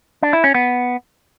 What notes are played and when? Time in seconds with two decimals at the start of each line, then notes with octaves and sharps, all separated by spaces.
0.23 D4
0.33 E4
0.44 C#4
0.55 B3